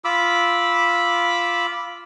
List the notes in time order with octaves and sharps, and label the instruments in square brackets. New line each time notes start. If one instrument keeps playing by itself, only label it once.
[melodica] F4 B5 D6 E6